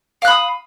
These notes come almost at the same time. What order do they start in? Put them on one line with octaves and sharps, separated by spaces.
F5 F#6 B5 D#6